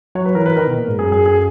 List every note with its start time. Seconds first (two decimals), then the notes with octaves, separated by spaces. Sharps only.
0.15 F#3 C#5
0.25 B4
0.35 E3 A#4
0.46 B4
0.56 D#3 A#4
0.67 B2
0.77 A#2
0.88 G#2
0.98 F#2 G#4
1.12 G#4
1.26 G#4